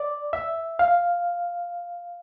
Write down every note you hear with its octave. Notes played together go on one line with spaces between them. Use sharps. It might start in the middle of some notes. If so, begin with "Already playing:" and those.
Already playing: D5
E5
F5